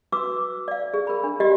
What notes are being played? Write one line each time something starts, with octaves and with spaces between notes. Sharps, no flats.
F#4 B4 D6 E6
D5 F5
G#4
A#4 B5
D4
F#4 G4 D5 D#5